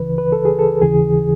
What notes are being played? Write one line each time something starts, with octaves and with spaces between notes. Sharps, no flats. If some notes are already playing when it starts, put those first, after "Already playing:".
Already playing: C#2 C#3 E3 B4
B4
A4
G#4
A4
D#2 C#3 E3 G#4